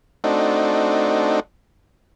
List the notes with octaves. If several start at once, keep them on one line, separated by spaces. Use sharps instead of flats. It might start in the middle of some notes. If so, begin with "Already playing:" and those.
A3 C4 D4 D#4 F#4